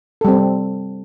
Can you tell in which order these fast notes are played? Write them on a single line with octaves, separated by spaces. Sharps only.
A4 G3 C4